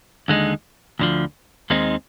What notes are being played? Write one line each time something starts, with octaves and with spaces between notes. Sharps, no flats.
D#2 D3 G#3 D#4
D2 D3 F3
D#2 D#3 G#3 C4 D#4